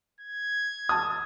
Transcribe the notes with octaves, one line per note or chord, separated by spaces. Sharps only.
G#6
A5 D#6